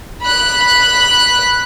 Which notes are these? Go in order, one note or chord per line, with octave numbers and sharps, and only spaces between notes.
B5 F#6